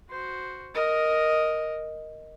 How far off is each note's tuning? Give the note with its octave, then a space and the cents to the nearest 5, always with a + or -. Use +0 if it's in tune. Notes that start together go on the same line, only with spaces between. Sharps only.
F#4 +0 C5 +0
A#4 +0 D#5 +0